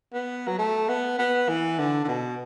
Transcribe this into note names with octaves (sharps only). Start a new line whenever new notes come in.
B3
F#3
A3
B3
B3
E3
D3
D3
B2